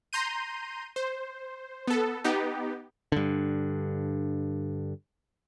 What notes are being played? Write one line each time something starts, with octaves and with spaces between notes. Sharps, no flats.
A#5 C6 G6 D#7
C5
B3 A4
B3 D#4 G4
G2 D3